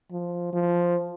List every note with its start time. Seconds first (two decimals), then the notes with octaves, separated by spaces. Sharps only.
0.11 F3
0.52 F3